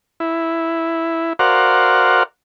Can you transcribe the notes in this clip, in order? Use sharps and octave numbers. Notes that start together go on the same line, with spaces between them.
E4
F#4 A#4 C5 D5 F5 F#5